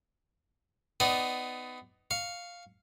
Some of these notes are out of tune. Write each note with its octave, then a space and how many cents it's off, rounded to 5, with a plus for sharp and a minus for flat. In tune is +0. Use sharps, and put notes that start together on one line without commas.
B3 +25 D#4 +0 D5 +0
F5 +0 C#6 +0